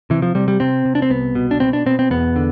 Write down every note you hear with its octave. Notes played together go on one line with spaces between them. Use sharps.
C3 E3
F3
C3 G3
G3
C3 C4
C3
D4
C4
C2 B3
B2
D4
B2 C4
D4
B2 C4
C4
E2 B3
D3